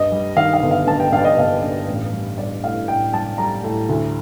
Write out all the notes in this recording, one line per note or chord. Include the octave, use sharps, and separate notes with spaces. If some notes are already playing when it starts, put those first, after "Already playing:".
Already playing: G2 D#5
G3
D#3 F5
F5
G1
F5
G2 A5
G5
G2 F5
D5
D#5
G1 F5
G2
A1
G3
G3 D5
A2 F5
A2 G5
G3 A5
G3 A#5
A2
D2